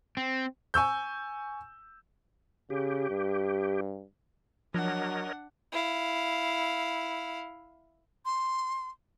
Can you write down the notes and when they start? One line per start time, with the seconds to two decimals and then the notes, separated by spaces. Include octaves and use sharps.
0.17 C4
0.74 G#5 C#6 E6 G6
2.70 C#3 G4
3.09 G2
4.74 F3 F#3 D4 A#4 C#5 D#5 F#5
5.72 E4 F5
8.25 C6